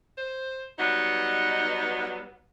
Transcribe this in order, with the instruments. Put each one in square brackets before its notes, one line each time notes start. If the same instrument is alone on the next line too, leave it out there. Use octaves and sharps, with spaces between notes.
[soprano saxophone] C5
[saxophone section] F#3 G3 B3 [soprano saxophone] D#4